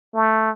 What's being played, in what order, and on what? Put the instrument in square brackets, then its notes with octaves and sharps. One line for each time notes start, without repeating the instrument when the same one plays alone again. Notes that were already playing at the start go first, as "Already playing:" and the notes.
[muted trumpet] A3